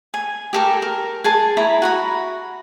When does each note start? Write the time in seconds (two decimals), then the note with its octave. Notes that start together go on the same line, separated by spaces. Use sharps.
0.14 G#5
0.53 G4 A4 A#4
0.82 A#4
1.24 G#4 G#5 A5
1.57 E4 A#5 B5
1.82 F#4 A#5 B5